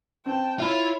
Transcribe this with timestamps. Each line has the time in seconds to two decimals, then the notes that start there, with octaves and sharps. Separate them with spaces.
0.26 C4 G5 A5
0.59 E4 F4 C#5 E5 B5